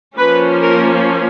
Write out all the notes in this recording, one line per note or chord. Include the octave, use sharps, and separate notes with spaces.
F3 A#3 C#4 B4
A#4